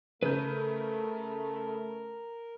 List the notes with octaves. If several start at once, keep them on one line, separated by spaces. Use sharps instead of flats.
C#3 A3 A#4 B4 G6